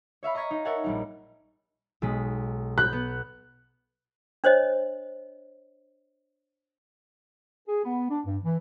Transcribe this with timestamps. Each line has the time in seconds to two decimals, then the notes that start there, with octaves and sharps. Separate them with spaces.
0.23 C#5 E5 F5 B5
0.35 D#5 A#5 C#6 G#6 B6
0.51 D#4
0.65 A#4 C#5 E5 F#5 G#5 A5
0.84 A#1 G3 D#4
2.02 B1 G#3 B6
2.78 B5 F#6 G6
2.93 B3
4.44 D4 C5 C#5 D#5
7.68 G#4
7.84 B3
8.10 D4
8.26 G2
8.44 E3